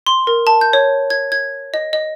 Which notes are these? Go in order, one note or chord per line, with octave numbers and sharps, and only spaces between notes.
C6
A#4
A5
G6
C#5
G#6
G#6
D#5
D#5